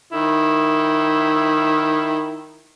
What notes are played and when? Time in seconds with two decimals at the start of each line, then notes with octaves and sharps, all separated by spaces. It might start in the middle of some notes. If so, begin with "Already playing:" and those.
0.12 D#3 E4